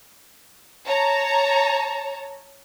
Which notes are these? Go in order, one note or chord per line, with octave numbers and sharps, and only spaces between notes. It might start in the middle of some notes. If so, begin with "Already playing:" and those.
C#5 A5 A#5